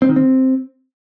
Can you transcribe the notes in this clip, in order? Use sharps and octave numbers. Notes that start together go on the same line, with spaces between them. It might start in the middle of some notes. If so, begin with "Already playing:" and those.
C4
D#3
C4